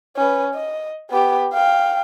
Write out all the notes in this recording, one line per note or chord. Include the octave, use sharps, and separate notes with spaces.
C#4 B4
D#5
B3 G4
F5 G5